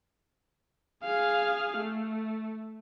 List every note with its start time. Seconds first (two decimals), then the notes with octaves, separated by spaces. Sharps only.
1.04 G#4 F5
1.78 A3